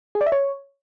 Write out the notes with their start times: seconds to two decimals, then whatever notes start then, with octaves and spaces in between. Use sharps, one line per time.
0.15 G#4
0.21 D5
0.26 E5
0.32 C#5